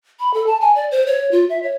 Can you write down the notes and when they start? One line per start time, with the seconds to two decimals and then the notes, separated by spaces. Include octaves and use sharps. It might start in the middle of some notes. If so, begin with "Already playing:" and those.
0.20 B5
0.34 A4
0.47 A5
0.61 G#5
0.75 D5
0.91 C5
1.07 C#5
1.31 F4
1.50 E5
1.63 C#5